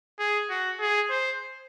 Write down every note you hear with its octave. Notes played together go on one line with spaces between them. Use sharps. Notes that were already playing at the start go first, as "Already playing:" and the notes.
G#4
F#4
G#4
C5